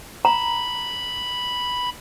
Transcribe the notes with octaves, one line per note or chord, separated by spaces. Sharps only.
A#5 B5